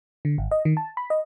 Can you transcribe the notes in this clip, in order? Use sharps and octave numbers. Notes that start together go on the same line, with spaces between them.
D3
G#1
D#5
D#3
A5
B5
D#5